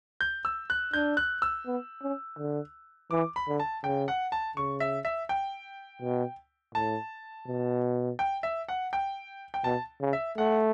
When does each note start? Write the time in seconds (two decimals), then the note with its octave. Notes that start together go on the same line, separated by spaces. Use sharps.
0.21 G6
0.45 E6
0.70 F#6
0.93 D4 G6
1.17 F#6
1.42 E6
1.66 B3
2.02 C#4
2.38 D3
3.11 E3 D6
3.36 B5
3.48 D3
3.60 A5
3.84 C#3 G5
4.08 F#5
4.32 A5
4.57 C#3 C#6
4.80 E5
5.05 E5
5.29 G5
6.02 B2
6.75 A2 A5
7.47 B2
8.19 G5
8.43 E5
8.68 F#5
8.93 G5
9.54 G5
9.64 B2 A5
10.01 C#3
10.13 E5
10.37 A3 F#5